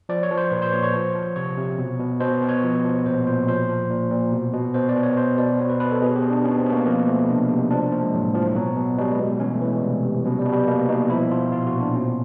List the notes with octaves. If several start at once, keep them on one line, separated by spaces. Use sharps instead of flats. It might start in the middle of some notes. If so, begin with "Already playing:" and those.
F3 D5
C#5
F3
C5
A#2 B4
C5
A#2 C#5
C#5
F3
F3
C3 C#5
C3
B2
B2
B2 C5
B2
C#5
F3
F3
A#2 C5
A#2 C5
F3 C5
F3
A#2
A#2
B2
B2
B2 C5
D5
B2
C#5
B2 C5
B2 D5
B2 C#5
B4
B2 B4
A4
B2 G#4
G4
B2
D4
B2 C#4
C4
B2
A#3
F3 A#3
F3 A3
C3 D4
C3 D#4
F3 D4
D4
F3 A#3
G#3
A2 F#3
A2 F3
B2 F#3
B2
B2 G3
G#3
B2
E3 C#4
A3
E3
G#3
C3 G3
C3
B2 F#3
G3
B2
G3
B2 A#3
B2 D#4
F3 E4
F3 F4
A#2 F4
F#4
A#2
D4
B2 C#4